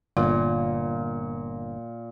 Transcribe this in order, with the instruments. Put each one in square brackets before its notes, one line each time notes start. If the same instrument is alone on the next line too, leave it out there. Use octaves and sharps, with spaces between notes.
[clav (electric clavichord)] G1 [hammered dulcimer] A#2